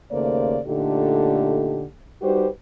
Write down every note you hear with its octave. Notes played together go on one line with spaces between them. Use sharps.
D#2 C#3 A3 A#3 C5 D5
A#2 D3 A3 D#4 G4 A4
G3 D#4 F#4 G4 B4 C5